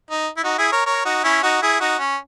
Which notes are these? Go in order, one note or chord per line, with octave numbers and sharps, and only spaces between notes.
D#4
E4
D#4 F#4
E4 G#4
A#4 C#5
A#4 C#5
D#4 F#4
C#4 E4
D#4 F#4
E4 G#4
D#4 F#4
C#4